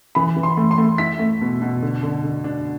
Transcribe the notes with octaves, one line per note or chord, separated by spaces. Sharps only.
E3 B5
E3
C6
A3
C6
A3
E4 B6
A3
B2
B2
D3
D3
D3
D4